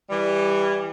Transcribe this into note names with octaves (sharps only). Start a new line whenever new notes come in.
E3 G3